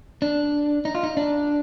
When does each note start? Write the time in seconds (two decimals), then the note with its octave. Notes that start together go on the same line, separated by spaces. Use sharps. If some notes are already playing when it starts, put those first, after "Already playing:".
0.22 D4
0.85 D#4
0.95 F4
1.03 D#4
1.17 D4